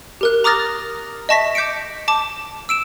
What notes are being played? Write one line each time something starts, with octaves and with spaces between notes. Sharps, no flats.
G4 A#4 F#6
A#5 D6 D#6 F6 A6 A#6
D#5 E5 A5 C#6 A#6 B6
D6 G6 B6 C#7 D7
A5 D6
E6 D7 E7